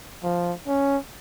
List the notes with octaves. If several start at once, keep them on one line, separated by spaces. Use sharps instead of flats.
F3
C#4